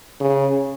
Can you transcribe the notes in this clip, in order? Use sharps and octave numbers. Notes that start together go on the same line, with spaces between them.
C#3